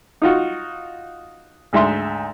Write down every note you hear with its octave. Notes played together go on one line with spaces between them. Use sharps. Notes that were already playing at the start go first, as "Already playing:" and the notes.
D#4 F4 F#4
D2 G#2 E5 C6